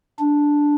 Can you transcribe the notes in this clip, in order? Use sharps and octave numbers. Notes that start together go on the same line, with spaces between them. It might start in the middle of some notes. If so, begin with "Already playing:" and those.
D4